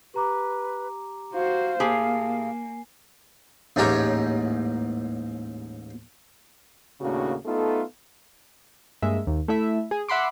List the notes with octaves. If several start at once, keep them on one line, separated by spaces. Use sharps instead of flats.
G4 B4 A#5 D6
F#4 C5 F5
A2 A#3 G4 G#4 G#5 C7
A1 D#2 G#2 G4 A#4 C#5
D#2 A2 C#3 A#3 D4 F#4
A3 B3 D#4 F4 A4
G2 G#3 A#3 E5
D#2
A3 E4 E5
G#4
E5 F#5 B5 C6 D6